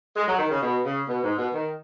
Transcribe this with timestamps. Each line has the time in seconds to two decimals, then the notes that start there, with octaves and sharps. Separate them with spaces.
0.17 G#3
0.27 F#3
0.39 D#3
0.50 C#3
0.62 B2
0.85 C#3
1.08 B2
1.22 G#2
1.38 B2
1.54 D#3